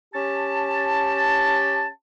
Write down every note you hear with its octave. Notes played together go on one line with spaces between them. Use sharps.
C#4 G4 A5